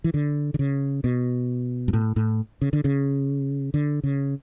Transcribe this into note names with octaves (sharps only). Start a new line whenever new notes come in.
E3
D3
D3
C#3
B2
G2
A2
A2
C#3
D3
C#3
D3
C#3